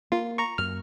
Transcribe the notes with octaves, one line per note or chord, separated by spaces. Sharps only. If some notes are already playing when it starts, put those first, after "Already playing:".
A#3 F4
A#5 C#6
F#2 A#3 F6